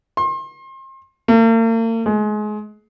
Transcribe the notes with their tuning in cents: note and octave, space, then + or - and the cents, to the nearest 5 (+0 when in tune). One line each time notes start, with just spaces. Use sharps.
C6 +35
A#3 -45
G#3 +30